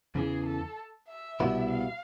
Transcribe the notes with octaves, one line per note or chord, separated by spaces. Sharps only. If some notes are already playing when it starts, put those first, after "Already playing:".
E2 C#3 E3 G#4
A4
E5
C2 B2 G3 B3 E4
F5